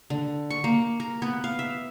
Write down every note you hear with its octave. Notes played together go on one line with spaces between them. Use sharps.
D3
C#6
A#3
A#4
B3
F5
E5